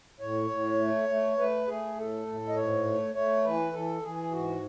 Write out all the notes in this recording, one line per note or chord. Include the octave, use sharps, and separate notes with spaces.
A2 C#5
A2
A3
A3
A3 B4
A3 G#4
A2 A4
A2
D#5
G#2 C#5
A3
A3 C#5
E3 B4
E3 A4
E3 G#4
G#2 F#4